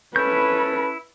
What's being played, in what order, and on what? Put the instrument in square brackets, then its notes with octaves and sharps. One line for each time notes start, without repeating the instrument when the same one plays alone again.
[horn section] C#4 A4 [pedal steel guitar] E4 G6 [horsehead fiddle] B4